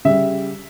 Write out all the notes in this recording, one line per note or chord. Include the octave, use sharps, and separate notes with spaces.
C#3 G3 E5